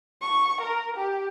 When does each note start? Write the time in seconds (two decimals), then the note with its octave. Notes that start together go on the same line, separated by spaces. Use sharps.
0.22 C#6
0.61 A#4
0.97 G4